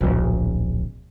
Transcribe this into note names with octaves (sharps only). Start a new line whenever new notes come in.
D1 A#1